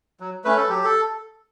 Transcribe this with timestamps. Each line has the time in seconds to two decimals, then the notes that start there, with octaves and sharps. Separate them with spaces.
0.20 F#3
0.45 A3 C#4 B4
0.57 A4
0.69 F#3 G4
0.85 A4